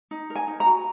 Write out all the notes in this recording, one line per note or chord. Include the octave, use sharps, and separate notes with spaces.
D#4
A#4
G#5
D#4
A#5
F#4